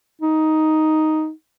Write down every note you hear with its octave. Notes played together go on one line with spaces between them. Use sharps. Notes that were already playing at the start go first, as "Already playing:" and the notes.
D#4